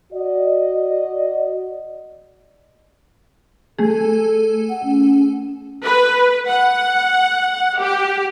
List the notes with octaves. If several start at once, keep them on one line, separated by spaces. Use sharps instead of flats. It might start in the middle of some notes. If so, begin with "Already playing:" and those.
F#4 D5 D#5
A3 G#4 A4
F#5
C#4
B4
F#5
G4